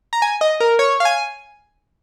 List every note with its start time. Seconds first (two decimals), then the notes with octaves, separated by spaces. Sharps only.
0.13 A#5
0.22 G#5
0.41 D#5
0.60 A#4
0.79 C#5
1.00 F5
1.05 G#5